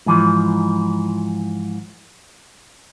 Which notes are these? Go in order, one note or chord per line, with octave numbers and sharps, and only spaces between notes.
G#2 E3 F3